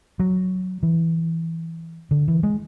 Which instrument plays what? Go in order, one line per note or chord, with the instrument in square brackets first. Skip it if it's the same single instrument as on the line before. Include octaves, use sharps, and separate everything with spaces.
[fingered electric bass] F#3
E3
D3
E3
G#3